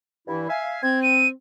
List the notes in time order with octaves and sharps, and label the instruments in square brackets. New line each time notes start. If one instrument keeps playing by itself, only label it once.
[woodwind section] G2 E3 E4
E5 F5 G#5
[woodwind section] C4 [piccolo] G#6
[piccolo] D#7